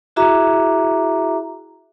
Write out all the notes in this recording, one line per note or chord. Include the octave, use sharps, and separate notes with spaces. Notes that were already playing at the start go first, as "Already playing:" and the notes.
E4 F#4 G#4 E5 A#5 D6